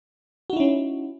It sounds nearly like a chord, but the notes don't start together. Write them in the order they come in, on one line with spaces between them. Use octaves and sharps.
F#4 D#4 E4 C#4